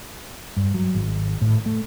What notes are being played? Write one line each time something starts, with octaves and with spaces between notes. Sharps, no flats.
G2
F#3
G#1
A2
A3